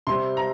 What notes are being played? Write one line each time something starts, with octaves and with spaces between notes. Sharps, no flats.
C3 G3 C4 C6
A#5